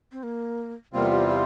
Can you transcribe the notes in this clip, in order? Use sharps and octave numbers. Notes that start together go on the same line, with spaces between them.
C4
A#3
E2 C3 G3 A#3 C4 F4
G4
G4